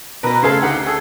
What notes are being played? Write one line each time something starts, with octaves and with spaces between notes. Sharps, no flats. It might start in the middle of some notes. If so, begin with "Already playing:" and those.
B2 A#4 B4 A#5
C#3 A3 G#4 A4 C5 C#5 E5 F5
D2 D#4 G4 F#5
C#4 G#4 A4